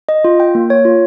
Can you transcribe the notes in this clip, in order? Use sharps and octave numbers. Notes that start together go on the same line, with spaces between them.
D#5
F4
G5
A#3
C#5
F4